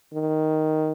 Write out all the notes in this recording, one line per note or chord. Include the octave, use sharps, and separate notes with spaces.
D#3